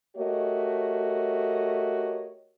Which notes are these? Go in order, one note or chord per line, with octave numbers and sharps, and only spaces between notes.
A3 F#4 G4 A#4 C#5 D#5